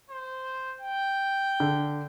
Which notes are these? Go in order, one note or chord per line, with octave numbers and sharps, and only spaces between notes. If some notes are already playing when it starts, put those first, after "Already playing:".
C5
G5
D3